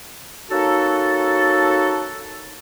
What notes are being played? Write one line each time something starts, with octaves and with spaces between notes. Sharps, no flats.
A#3 C#4 D#4 F#4 A4